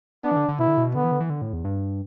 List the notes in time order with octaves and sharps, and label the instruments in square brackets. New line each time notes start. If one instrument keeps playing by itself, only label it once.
[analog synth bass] B3 [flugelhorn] D4
[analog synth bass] E3
D3
D3
[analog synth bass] B2 [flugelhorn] E4
[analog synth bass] D3
B2
[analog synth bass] D3 [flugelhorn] B3
[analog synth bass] E3
D3
E3
D3
A2
E2
G2